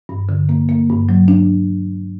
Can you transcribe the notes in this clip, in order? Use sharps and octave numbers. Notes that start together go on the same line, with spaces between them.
G2
D3
A#3
A#3
G2
F#3
D4